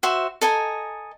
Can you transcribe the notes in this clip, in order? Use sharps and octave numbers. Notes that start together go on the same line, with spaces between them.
F#4 C5 E5
A4 D#5 G#5 A#5